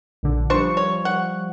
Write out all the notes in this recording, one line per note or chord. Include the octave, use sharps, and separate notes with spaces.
A#1 D3
F3 G3 D4 C5 C#6
C#5
F#5